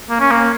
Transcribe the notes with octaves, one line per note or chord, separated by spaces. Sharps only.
A#3
C#4
A#3